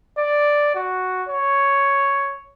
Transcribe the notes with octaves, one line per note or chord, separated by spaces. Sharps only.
D5
F#4
C#5